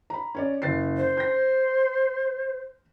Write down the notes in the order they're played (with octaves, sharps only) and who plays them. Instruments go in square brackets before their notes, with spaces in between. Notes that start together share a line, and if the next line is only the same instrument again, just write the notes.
[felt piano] A#5 B5
C#4 C#5 D5
F#1 A6 C7
[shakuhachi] C5
[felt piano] G6 A#6